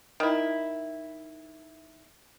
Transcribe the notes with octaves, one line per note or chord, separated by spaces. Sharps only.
D#3 E4